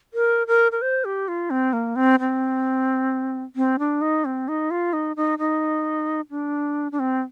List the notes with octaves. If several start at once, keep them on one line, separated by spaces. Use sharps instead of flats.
A#4
A#4
A#4
C5
G4
F4
C4
A#3
C4
C4
C4
D4
D#4
C4
D#4
F4
D#4
D#4
D#4
D4
D4
C4